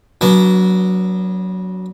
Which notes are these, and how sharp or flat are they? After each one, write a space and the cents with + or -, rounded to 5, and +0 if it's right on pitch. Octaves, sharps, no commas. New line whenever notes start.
F#3 +0 B3 -30 D4 -35